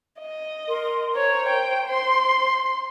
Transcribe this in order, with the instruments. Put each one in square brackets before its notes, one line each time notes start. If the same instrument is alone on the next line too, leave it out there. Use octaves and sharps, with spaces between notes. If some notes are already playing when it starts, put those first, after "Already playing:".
[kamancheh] D#5
[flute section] A#4 C6
[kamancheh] A#4 C#5 [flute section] C5
[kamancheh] G5
C6